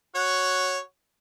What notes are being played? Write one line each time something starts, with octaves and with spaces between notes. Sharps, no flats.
F#4 C#5